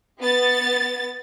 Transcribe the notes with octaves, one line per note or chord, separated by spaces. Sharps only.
B3 A6